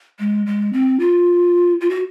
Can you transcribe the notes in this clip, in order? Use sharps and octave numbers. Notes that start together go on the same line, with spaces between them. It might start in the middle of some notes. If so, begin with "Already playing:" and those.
G#3
G#3
C4
F4
F4
F#4